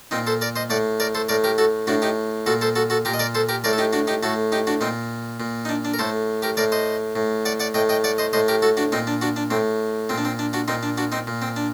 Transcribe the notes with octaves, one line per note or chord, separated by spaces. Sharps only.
A#2 C4 D#4
A4 C5
A#4 D5
C5 D#5
A2 D5 F#5
A#4 D5
A4 C5
A2 A#4 D5
G4 A#4
F#4 A4
A2 D4 F#4
D#4 G4
A#2 F#4 A4
A4 C5
F#4 A4
F#4 A4
A#2 G4 A#4
D#5
A#4 D5
A4 C5
G4 A#4
A2 A#4 D5
A4
D#4 G4
D4 F#4
D#4 G4
A2 F#4 A4
D#4 G4
D4 F#4
A#2 C4 D#4
A#2
D#4
D4
D4
A#4
A2 A4 C5
G4 A#4
A2 A#4 D5
C5 D#5
A2
D5 F#5
D5 F#5
A2 D#5 G5
D#5 G5
D5 F#5
C5 D#5
A2 C5 D#5
G4 A#4
F#4 A4
D4 F#4
A#2 C4 D#4
D4
D4 F#4
D4
A2 C4
A#2 C4
D4
C4
D4
D4 F#4
A#2 C4 D#4
D4
D4 F#4
C4 D#4
A#2
C4
D4